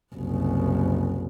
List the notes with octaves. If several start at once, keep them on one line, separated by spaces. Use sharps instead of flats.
F#1 C2